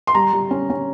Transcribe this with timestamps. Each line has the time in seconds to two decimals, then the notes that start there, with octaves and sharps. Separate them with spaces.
0.07 C6
0.15 G3 A#5
0.33 G3
0.51 C#4
0.70 C#4